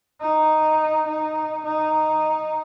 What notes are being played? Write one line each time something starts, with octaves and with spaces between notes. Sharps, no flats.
D#4
D#4
D#4